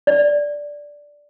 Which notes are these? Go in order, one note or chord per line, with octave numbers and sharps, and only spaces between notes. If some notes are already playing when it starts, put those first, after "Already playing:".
D5